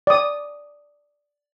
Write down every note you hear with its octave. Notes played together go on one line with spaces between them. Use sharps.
D5 D#6